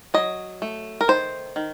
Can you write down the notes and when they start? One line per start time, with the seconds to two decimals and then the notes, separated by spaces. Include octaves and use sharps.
0.14 F#3 D#5
0.62 A3
1.01 A#4
1.08 D#3 C5
1.56 D#3